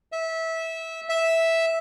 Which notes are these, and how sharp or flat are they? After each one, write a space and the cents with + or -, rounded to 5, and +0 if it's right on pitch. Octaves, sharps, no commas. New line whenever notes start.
E5 -20
E5 -5